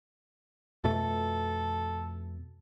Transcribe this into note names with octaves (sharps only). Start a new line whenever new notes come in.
F2 B2 A3 A4